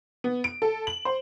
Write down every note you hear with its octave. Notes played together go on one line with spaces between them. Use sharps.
B3
D7
A4
F#7
C5